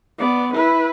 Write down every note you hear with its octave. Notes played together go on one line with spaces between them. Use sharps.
B3 D5
E4 B4